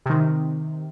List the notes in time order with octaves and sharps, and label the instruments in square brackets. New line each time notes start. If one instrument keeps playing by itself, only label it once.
[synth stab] C3 D#3